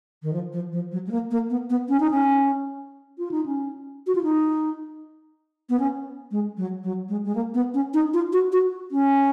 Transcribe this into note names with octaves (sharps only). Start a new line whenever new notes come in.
D#3
F3
F3
F3
F#3
G#3
A#3
A#3
B3
B3
C#4
D#4
C#4
F4
D#4
C#4
F#4
F4
D#4
B3
C#4
G#3
F#3
F#3
G#3
G#3
A#3
B3
C#4
D#4
F4
F#4
F#4
C#4